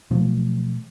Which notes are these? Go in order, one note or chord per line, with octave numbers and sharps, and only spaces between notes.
B2 F3 F#3 A3